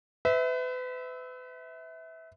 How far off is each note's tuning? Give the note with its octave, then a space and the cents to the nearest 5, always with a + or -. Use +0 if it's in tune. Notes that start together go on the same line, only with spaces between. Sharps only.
B4 +35 E5 -20